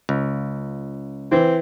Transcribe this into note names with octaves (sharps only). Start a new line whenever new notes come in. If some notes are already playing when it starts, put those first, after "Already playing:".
C#2
E3 C4